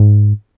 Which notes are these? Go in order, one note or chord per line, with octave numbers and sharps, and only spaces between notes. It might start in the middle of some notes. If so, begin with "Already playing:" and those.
Already playing: G#2